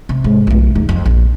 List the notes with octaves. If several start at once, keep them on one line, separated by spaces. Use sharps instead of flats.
C3
G#2
B1 A3
E2 D#4
F2
A#1